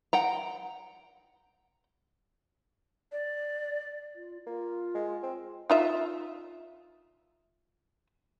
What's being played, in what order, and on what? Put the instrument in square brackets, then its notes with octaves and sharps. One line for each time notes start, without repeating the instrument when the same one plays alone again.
[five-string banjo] F#5 G5 A#5
[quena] D5
[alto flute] F4
[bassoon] A#3 [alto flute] F4
[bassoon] G#3
C4
[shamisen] D#4 F4 E5